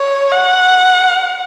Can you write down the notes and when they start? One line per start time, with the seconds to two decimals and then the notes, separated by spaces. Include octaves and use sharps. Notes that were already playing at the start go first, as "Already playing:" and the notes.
Already playing: C#5
0.32 F#5